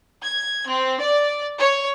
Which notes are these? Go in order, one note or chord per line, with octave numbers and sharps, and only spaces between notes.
G#6
C4
D5
C#5